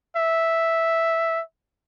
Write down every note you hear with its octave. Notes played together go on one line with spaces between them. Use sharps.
E5